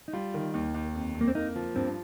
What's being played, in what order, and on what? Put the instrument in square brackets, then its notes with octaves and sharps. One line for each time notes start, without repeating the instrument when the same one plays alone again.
[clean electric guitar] D#4
[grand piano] G3 [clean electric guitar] F4
[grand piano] D#3
D#2
D#2
F2
F2
[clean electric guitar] A#3
C4
[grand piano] A#3 [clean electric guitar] D#4
[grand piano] F3
[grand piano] G2 [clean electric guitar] C4